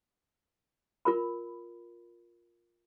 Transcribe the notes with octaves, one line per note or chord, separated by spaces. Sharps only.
F4 A#4 B5